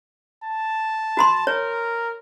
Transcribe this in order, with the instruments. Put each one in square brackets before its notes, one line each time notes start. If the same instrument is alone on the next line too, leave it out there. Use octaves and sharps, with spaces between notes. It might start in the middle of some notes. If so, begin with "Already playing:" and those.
[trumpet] A5
[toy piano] F#4 B5 C6
[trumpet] A#4 [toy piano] C#5